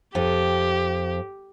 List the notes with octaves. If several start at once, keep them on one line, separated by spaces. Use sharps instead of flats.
F2 G4